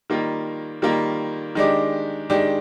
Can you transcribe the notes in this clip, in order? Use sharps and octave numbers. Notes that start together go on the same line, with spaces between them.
D#3 G3 A#3 F4
D#3 G3 A#3 F4
D#3 G#3 D4 G4
D#3 G#3 D4 G4